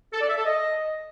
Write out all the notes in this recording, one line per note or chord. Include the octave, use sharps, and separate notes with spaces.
A4
D5
E5
A4
D#5